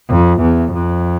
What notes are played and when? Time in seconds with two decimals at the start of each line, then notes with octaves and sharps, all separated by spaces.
0.09 F2
0.41 E2
0.73 F2